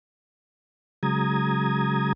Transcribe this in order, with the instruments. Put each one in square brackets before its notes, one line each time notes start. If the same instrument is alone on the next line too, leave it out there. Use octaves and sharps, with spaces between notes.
[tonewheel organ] C#3 F#3 G#3 A#5 D#6 G#6